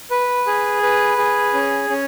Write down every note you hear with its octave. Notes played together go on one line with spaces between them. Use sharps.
B4
G#4
B4
G#4
C#4
C#4